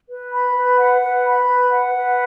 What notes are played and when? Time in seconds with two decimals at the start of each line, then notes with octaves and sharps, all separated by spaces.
0.09 B4
0.33 B5
0.55 B4
0.79 F#5
1.02 B4
1.25 B5
1.47 B4
1.71 F#5
1.94 B4